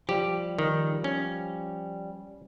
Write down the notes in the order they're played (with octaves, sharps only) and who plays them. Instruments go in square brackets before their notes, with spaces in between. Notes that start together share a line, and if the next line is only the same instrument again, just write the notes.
[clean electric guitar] F3 G3 [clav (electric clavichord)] G4
[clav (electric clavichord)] D#3
C#4